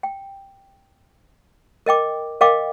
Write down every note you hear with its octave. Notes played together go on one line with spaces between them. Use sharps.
G5
A#4 D#5 G5 D6
A#4 D#5 F5 G5 D6